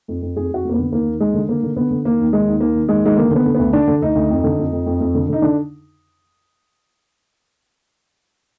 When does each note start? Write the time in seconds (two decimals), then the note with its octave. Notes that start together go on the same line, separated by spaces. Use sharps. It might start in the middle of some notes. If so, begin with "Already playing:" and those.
0.08 F2
0.22 F2
0.36 F2 G#4
0.51 F2 F#4
0.65 F2 A#3
0.74 D3 B3
0.92 D#2 A#3
1.06 D#2
1.20 D#2 G#3
1.34 D3
1.49 D3 A#3
1.63 D3
1.76 D3 B3
1.91 D3
2.05 D#2 A#3
2.19 D#2
2.32 D#3 G#3
2.48 D#2
2.60 D#3 A#3
2.75 D#3
2.89 D#2 G#3
3.04 D#3 G#3
3.17 D3 A#3
3.31 D3 B3
3.46 D3
3.54 D2 B3
3.73 D3 D4
3.87 D3
4.02 D2 D#4
4.15 D2
4.29 F2
4.44 D3
4.59 F2
4.72 F2
4.86 F2
5.00 F2
5.15 D3
5.29 D3 D#4
5.42 D3 D4